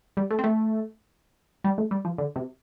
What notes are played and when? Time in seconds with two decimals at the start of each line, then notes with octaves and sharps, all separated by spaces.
0.17 G3
0.31 A3
0.39 C4
0.44 A3
1.64 G3
1.78 A3
1.91 G3
2.05 F3
2.18 D3
2.36 C3